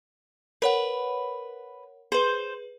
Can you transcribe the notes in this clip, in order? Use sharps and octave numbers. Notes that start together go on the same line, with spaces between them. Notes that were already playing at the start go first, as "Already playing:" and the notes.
A#4 B4 C#5 F#5
G#4 B4 C5